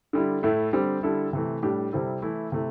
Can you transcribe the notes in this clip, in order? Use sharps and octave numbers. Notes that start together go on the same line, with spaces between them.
D3 G3 E4
A2 A3 E4
D3 G3 C4 G4
D3 G3 E4 A4
C3 E3 A3
A2 G3 D4 G4
C3 G3 C4 E4 A4
E3 A3 E4
C3 A3 E4